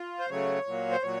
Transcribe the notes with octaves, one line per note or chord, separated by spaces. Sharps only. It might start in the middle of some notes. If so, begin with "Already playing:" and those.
Already playing: F4
C5
C#3 F#3 A3 C#5
A#2 F#3 A#3
C5
A#2 F#3 C#5